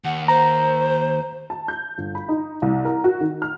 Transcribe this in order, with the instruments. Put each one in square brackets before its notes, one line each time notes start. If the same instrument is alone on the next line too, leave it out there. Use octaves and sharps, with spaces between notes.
[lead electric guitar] D#2 [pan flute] F#5
[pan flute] C5 [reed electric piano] A#5
[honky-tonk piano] A5
G6
G1
B5
D#4
C2
A#4
F#4
D#3
F6